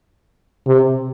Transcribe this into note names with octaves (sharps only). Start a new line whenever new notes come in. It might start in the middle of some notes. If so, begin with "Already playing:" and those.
C3